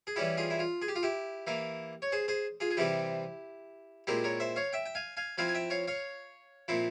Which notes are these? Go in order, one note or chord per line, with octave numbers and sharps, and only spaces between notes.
G#4
E3 G3 C#4 E4 G4
F4 G#4
E4
F4
G#4
G4
F4
E4 G4
E3 A#3 E4
C#5
G#4 C5
G#4 C5
F4 G#4
G#4
C3 E3 G3 C4 E4 G4
A#2 G#3 C4 E4 G4 A#4
A#4 C#5
C5 E5
C#5 F5
E5 G5
G5
F5 G#5
F5 G#5
F3 C4 E4 F5 G#5
G#5
E5 G5
C#5 F5
C#5 F5
A#2 F3 C4 E4